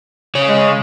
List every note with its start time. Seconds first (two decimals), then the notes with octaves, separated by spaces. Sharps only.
0.35 C#3 C#5
0.48 G#3